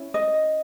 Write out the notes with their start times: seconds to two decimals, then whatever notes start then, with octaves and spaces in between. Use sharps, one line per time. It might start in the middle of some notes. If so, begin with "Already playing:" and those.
Already playing: C#4 E4
0.14 D#5